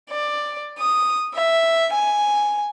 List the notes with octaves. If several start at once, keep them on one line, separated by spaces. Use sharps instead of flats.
D5
D#6
E5
G#5